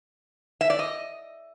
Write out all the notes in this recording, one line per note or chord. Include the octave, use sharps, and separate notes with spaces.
E5
D5
D#5